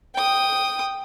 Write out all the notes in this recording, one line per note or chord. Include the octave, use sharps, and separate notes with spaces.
G5 D#6